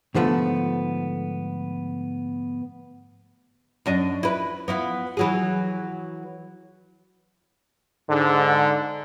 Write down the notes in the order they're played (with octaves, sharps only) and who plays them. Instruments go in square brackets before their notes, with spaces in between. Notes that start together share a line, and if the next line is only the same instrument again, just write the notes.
[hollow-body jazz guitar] G#2 D3 F3 A3 B3
[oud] F#2 D4 D#5
E4 B4
B3 E4 F4
E3 F#3 G#4
[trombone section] G#2 D3